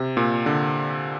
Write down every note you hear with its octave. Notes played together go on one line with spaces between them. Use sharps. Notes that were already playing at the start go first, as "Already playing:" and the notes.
Already playing: C3
A#2
D3